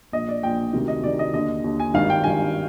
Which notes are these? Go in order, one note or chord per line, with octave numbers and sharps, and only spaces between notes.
A#1 A#2 D#5
D5
A#1 A#2 G5
D2 C3 D#3
D#5
D2 C3 D#3 D5
D#5
D#2 D3 D#5
D#2 D3
G#5
G#1 G2 D#3 F5
G5
G#1 G2 D#3 G#5